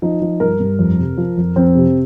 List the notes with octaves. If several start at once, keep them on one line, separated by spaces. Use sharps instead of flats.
F3 D#4
F3
G2 A#4
G2
F2
C3
F3
F2
F2 C4
C3